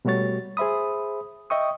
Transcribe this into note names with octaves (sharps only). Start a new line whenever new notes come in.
B2 G3 A3 F#4 C#5 A6
G#4 C5 E5 B5 D#6
D#5 E5 G5 C#6 D#6